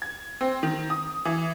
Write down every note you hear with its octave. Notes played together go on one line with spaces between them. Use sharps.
G#6
C4
D#3
D#6
E3